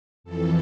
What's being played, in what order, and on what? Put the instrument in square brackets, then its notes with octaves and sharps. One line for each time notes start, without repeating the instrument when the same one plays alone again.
[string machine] F2 E3 A4